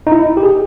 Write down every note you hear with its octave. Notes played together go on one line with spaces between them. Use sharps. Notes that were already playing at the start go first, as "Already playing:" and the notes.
D#4
E4
G4
G#4